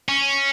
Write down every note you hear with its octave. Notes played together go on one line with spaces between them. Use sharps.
C#4